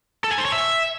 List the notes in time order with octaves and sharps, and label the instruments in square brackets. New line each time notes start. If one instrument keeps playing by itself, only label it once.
[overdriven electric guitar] A4
G#5
C5
C#5
E5